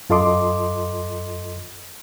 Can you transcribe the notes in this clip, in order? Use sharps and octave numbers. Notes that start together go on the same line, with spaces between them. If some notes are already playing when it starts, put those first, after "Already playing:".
F#2 F4 A4 D#5 C6 D6